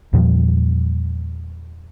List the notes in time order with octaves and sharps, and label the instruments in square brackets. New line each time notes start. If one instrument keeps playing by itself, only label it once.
[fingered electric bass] E2 A#2 F3 G3